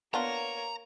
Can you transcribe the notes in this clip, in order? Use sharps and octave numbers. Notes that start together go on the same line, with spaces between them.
A#3 B3 D4 F4 C#5 A#5